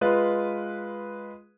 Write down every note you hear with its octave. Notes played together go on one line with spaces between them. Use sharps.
G#3 F4 B4